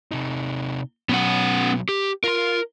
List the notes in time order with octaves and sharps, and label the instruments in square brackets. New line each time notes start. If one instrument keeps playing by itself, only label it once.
[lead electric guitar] C3 D#4
[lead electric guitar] B2 F#3 [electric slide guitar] B3 C#4 F#5
[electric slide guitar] G4
[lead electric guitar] F4 C6 [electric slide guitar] A#4